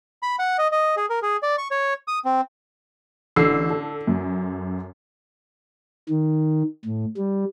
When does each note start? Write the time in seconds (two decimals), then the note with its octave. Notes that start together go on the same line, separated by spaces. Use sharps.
0.23 B5
0.39 F#5
0.58 D#5
0.72 D#5
0.97 G#4
1.10 A#4
1.22 G#4
1.43 D5
1.58 C#6
1.71 C#5
2.08 D#6
2.25 C4
3.36 A1 D3 E6 C7
3.70 A4
4.07 F#2
6.09 D#3
6.85 A2
7.17 G3